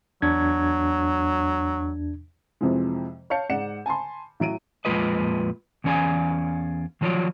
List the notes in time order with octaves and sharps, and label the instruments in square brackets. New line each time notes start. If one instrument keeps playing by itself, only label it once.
[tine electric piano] E2 D4 G#6 [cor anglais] F#3
[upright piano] F2 C3 E3 F3 G#3
C#5 F5 A5 G6 C#7
G#2 D5 F#5 C#7 E7
G#5 A5 B5 C6
A2 F#3 D7 D#7
[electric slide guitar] F2 A#2 G#3 F4 B4 D#5
E2 E3 C#4 D5 F5 G#5
D#3 F3 F#3 F4 C#5 D5